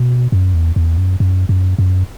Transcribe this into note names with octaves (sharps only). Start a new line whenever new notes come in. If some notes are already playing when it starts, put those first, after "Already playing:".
Already playing: B2
F#2
E2
E2
F#2
F#2
F#2
F#2